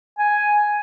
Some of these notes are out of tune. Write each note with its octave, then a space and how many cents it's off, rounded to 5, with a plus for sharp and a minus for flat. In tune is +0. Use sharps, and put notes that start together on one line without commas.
G#5 +5